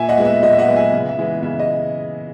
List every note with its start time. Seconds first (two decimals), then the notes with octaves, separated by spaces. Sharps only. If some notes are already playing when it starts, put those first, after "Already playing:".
Already playing: A#2 E5 G#5
0.09 D#5 F#5
0.18 G#3 B3
0.25 E5
0.43 A#2 D#5
0.53 E5
0.59 D#5 F#5
0.67 G#3 B3
0.76 E5 G#5
0.93 C#3
1.09 E5
1.18 E3 G#3 B3
1.43 C#3 E5
1.59 D#5